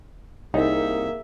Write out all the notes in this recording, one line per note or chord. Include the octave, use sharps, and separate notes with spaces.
C2 A#3 D#4 G#4 E5